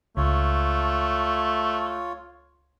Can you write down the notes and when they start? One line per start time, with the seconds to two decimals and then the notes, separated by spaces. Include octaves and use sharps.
0.17 C#2 A3 F4 C#5